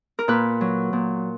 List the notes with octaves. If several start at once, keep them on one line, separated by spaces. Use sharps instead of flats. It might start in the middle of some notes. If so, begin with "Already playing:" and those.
A#4
A#2 B4
F#3
A#2